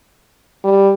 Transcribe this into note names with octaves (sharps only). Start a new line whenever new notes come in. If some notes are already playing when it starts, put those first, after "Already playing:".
G3